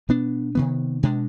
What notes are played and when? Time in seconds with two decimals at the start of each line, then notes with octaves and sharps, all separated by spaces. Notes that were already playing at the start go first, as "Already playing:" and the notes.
0.09 B2 B3 D4
0.55 C3 D#3 B3
1.03 B2 G#3 D4